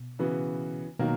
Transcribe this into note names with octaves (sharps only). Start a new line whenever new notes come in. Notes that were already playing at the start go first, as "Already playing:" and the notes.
Already playing: B2
C#3 E3 B3 F#4
B2 D#3 F#3 A#3